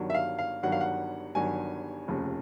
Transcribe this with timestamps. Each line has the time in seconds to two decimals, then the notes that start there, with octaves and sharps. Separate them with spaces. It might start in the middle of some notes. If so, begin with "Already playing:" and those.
Already playing: G1 G2 D#3 F#3
0.10 E5
0.14 F5
0.39 F5
0.63 G1 G2 D#3 F#3 F#5
0.72 F5
0.81 F#5
1.35 G1 G2 D#3 F#3 G#5
2.08 F1 D#2 C#3 F3